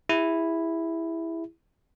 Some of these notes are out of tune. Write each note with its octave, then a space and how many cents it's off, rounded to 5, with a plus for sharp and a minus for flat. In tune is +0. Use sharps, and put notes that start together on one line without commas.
E4 +0 G#4 -40